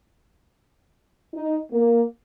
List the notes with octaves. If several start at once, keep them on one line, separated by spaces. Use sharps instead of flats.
D#4
A#3